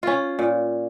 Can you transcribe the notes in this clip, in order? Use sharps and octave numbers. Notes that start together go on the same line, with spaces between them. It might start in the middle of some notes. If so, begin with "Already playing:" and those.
C#4 F4
A#2